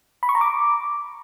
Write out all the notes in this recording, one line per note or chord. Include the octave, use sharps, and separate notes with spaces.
B5
C#6
A#5
D6